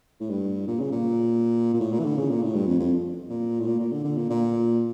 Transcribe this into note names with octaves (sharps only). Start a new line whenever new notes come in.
A2
G2
A#2
C#3
A#2
A#2
A2
A#2
E3
D3
C#3
A#2
A2
G2
F2
F2
A#2
A2
A#2
A#2
D3
D3
A#2
A#2